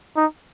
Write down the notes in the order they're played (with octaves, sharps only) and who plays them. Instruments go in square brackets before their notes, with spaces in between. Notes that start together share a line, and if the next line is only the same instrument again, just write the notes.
[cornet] D#4